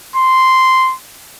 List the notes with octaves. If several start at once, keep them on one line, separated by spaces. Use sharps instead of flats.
C6